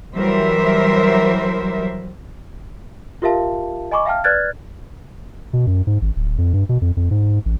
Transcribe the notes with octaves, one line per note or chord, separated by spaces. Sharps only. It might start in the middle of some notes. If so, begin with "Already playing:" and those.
E3 F#3 G3 A#4 C5 E5
F4 G4 A#4 E5 F5 A5
D#5 G#5 B5 C#6 D6
E5 F5 G5 A5 F6
B4 D5 F6 F#6 G#6 A6
B2
F#2
G#2
G#1
D1
F2
G2
B2
F2
F2
G#2
A1